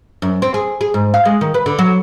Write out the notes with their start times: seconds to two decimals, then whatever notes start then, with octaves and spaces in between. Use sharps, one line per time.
0.22 F#2
0.42 C4
0.54 G#4
0.81 G#4
0.94 G#2
1.14 F5
1.25 G#3
1.41 D#3
1.54 B4
1.66 D3
1.79 F#3